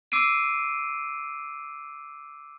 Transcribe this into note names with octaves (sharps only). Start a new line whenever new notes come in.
D6 E6 C7 D7 D#7